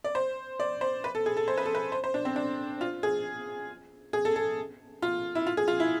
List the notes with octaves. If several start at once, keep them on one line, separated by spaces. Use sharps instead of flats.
D5
C5
D5
C5
B4
A4
G#4
A4
C5
B4
A4
B4
C5
C5
D4
C4
D4
F4
G#4
G#4
A4
A4
F4
E4
F4
G#4
F4
E4